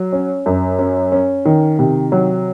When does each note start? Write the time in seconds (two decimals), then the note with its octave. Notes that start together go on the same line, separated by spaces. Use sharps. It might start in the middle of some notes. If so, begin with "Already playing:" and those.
Already playing: F#3
0.12 C#4
0.46 F#2
0.79 C#4
1.12 C#4
1.45 D#3
1.79 C3
2.12 F#3